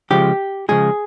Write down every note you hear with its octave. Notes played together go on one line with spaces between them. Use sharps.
C#3 F3 G#3 G4
C#3 F3 G#3 G#4